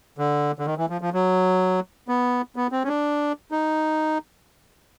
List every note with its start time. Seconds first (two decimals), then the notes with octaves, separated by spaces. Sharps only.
0.18 D3
0.59 D3
0.66 D#3
0.78 E3
0.90 F3
1.01 F3
1.13 F#3
2.08 B3
2.56 B3
2.72 C4
2.84 C#4
2.88 D4
3.52 D#4